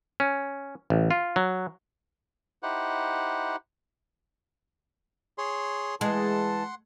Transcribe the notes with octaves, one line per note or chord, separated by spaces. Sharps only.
C#4
A1
F4
F#3
D#4 E4 G4 C5 F#5
G#4 C#5 C6
E3 G#3 F#5 A5 C6